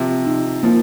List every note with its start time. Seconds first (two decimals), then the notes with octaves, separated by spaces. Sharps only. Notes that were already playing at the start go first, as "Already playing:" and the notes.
Already playing: C3 F3
0.27 D#4
0.63 F3 A#3